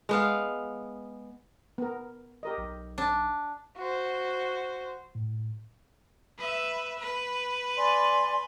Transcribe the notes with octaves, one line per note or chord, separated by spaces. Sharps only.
G#3 B3 F5
B3 A#4
G4 A#4 D#5
B1
D4
F#4 C5
A2
B4 E5
B4
D5 G#5 C6